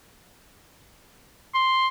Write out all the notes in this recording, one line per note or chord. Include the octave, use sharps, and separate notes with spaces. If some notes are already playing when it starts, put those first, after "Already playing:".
C6